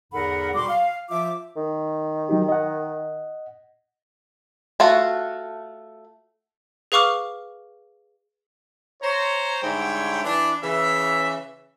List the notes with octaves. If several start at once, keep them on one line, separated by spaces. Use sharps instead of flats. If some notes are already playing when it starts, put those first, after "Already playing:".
E2 G#2 D3 A#4 F#5 B5
B2 G3 F#4 C6 D6
F5
F3 F4 E5 D6
D#3
F#3 D#4 G4
D#5 F#5
A3 F4 F#4
G#4 B4 F5 C#6 D6 F6
C5 C#5 A#5
G#2 D3 G3 E4 C#5 G5
E3 D4
C#3 E3 E5